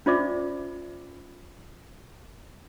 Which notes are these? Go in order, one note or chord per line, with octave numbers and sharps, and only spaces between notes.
C#4 F4 C5 D5 E5 D6